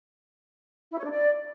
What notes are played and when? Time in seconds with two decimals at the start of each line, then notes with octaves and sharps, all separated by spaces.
0.91 E4
0.98 C#5
1.04 D4
1.10 D5